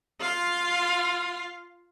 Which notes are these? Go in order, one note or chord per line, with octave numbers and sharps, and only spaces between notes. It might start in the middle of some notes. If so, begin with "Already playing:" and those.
F4 F5